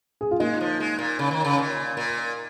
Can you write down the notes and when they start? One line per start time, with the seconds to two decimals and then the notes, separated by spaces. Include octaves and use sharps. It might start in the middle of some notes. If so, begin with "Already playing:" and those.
0.21 G#4
0.31 F4
0.40 G#3 A#3 D#4
0.60 F3
0.80 G#3
0.99 A#2
1.19 C#3
1.31 D#3
1.44 C#3
1.58 A#2
1.97 A#2